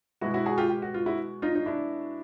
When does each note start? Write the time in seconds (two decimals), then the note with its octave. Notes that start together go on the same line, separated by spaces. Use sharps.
0.21 B2 G#3 E4 F#4
0.34 E4 F#4
0.46 F#4 G#4
0.58 F4 G4
0.70 G4
0.82 F#4
0.94 F4
1.06 E4 F#4
1.42 D#4 F4
1.55 D#4
1.66 D4 E4